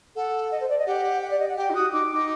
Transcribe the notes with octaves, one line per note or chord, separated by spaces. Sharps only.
A4 F#5
D#5
C5
D5
D#5
G4 F#5
F#5
D5
D#5
F#5
G4 G5
D#4
F#4 D#6
D#4 D6
D#4